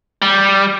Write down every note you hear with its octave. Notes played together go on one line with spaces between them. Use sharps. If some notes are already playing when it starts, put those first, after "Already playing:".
G3